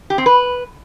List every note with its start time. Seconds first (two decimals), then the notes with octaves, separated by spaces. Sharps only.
0.10 G4
0.18 C4
0.26 B4